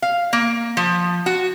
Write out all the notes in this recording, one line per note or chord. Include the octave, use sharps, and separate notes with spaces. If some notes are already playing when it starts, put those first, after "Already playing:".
F5
A#3
F3
F#4